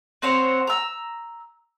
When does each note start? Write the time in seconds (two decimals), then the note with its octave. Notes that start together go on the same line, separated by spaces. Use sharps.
0.22 C4 F#4 C5 C#5
0.67 A#5 E6